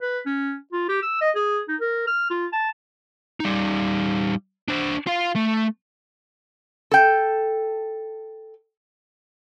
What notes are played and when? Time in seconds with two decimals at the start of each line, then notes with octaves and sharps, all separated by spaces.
0.02 B4
0.26 C#4
0.73 F4
0.89 G4
1.02 E6
1.21 D#5
1.35 G#4
1.68 D#4
1.80 A#4
2.07 F6
2.30 F4
2.53 A5
3.40 G3 D#4
4.68 D4 C5
5.07 F4 F5
5.36 A3
6.91 A4 G5